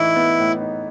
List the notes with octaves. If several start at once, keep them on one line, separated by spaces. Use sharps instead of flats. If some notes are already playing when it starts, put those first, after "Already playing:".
Already playing: A2 E3 D#4 E4
B3
A2
D#4